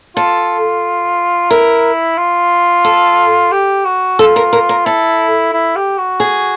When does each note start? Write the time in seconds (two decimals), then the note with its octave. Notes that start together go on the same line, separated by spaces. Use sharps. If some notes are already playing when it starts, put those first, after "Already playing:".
0.16 F4 A4
1.51 E4 A#4
2.18 F4
2.85 A4
3.51 G4
3.85 F#4
4.19 F4 A4
4.36 A#4
4.53 A#4
4.69 A#4
4.86 E4 A4
5.53 E4
5.76 G4
5.98 F#4
6.20 G#4